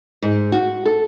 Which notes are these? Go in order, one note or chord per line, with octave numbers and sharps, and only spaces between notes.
G#2
F#4
A4